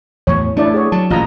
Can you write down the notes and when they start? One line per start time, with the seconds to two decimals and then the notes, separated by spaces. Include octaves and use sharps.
0.27 E2 A2 C#5
0.57 A3 D4 E4 D5
0.74 G#4 C#5
0.92 F#3 A5
1.10 A1 A#2 F4 D#5 A#5